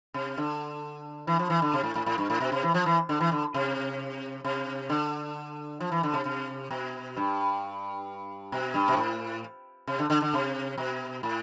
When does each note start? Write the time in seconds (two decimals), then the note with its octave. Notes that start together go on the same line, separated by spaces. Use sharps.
0.14 C3
0.37 D3
1.27 E3
1.39 F3
1.50 E3
1.62 D3
1.73 C3
1.83 A2
1.95 A2
2.06 A2
2.18 G2
2.30 A2
2.40 B2
2.52 C3
2.63 E3
2.74 F3
2.86 E3
3.09 D3
3.20 E3
3.32 D3
3.54 C3
4.44 C3
4.90 D3
5.80 F3
5.92 E3
6.03 D3
6.14 C3
6.25 C3
6.71 B2
7.17 G2
8.52 B2
8.74 G2
8.88 B2
8.97 A2
9.87 C3
9.99 D3
10.10 D3
10.22 D3
10.33 C3
10.78 B2
11.23 A2